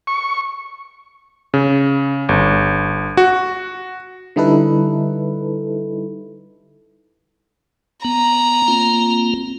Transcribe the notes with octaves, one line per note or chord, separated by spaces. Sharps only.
C#6
C#3
G1
F#4
D3 G3 D#4 E4 A4 B4
B3 A#5
A#3 C4 F4